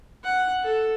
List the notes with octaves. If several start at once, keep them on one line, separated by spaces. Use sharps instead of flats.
F#5
A4